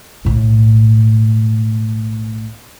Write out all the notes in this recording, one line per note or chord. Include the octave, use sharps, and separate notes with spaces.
B1 A2